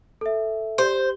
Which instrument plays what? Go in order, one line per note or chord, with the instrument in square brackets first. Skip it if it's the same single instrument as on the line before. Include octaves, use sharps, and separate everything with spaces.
[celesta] A4 E5
[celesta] G4 [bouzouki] C5